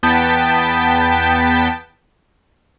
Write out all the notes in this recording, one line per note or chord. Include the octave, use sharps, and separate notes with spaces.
E2 B3 G5 A5 B6